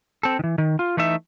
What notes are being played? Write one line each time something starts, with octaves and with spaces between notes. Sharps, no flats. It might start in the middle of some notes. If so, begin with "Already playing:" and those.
C4 A4
D#3 E3
D#3
F4
E3 A3 D#4 E5